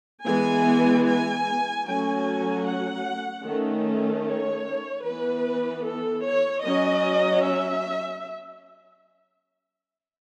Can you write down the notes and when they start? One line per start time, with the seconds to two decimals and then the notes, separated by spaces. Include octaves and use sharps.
0.25 E3 G#3 B3 G#5
1.05 G#5
1.85 F#3 A3 C#4 G#5
2.65 F#5
3.44 D#3 A3 C#4
4.25 C#5
5.05 E3 B3 B4
5.85 A4
6.24 C#5
6.64 F#3 C#4 D#5
7.44 E5